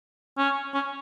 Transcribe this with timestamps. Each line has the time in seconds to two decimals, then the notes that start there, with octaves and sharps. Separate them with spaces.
0.38 C#4
0.74 C#4